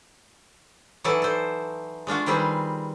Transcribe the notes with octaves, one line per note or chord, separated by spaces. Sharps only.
E3 F#3 D#4 A4 D5 G#5
A4 C5
G#3 D4 F4 F#4
D#3 G3 C4 G#4 B4